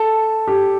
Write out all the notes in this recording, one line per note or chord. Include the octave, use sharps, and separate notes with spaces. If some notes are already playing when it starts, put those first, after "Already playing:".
Already playing: A4
G4